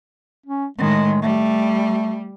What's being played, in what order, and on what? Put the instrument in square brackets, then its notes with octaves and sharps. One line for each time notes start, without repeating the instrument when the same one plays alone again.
[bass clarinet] C#4
[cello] A2 D#3 [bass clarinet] G#3
[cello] G3 [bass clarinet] A3